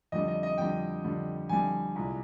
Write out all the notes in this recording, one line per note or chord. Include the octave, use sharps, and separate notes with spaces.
F2 D3 G3 D#5
D#5
D#5
F2 D3 G3 G5
F2 D3 G3
F2 D3 G3 G#5
C2 A#2 G#3